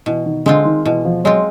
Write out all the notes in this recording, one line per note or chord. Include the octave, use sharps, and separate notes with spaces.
B2 E3
D#3
D3 G#3 C4 F4
D#3
B2 E3
F3
F#3 G#3 C4 F4